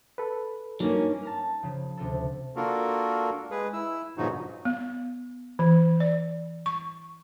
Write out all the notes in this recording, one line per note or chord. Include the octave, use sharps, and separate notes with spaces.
A4 B4
G2 F#3 A#3 C#4 D#4
A5 A#5 F6
C#3 F3
D2 C3 F4 A4
A#3 D4 F4 F#4 A4 A#4
G#3 G#4 B4
E4 E6
G2 A#2 C#3 F3 D#4 F#4
B3
E3
D5
C#6